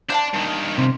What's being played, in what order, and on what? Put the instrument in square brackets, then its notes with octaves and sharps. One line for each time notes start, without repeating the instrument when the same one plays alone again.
[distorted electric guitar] D4 [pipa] C5 F5 A5
[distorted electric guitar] G2 D#3
[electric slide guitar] C3